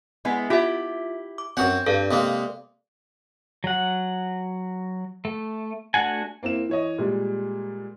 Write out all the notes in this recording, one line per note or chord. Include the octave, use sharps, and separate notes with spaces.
G#3 B3 E4
E4 F4 G4 E5
D6
F#2 C4 F#4 F#5
G2 A4 D5 F5
C3 G#3 A#3
F#3 F#5
A3
A3 D4 F#4 F#5 G#5
A#3 C4 E4 E7
E3 C#5 D#5
A#2 G3 G#3